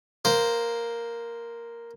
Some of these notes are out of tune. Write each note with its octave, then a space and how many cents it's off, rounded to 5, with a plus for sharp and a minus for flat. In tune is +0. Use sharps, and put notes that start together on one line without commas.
A#3 +0 C5 -5